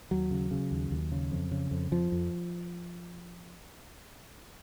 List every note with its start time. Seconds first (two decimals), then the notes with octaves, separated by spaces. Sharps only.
0.11 D#2 F#3
0.31 C#3
0.51 C#3
0.71 D#2
0.91 D#2
1.12 C#3
1.32 F2
1.51 C#3
1.71 F2
1.91 F2 F3
2.12 F2